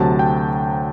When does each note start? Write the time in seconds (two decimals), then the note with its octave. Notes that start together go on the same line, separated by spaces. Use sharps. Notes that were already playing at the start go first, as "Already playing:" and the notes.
Already playing: D2 C3 F#3 A5
0.19 G5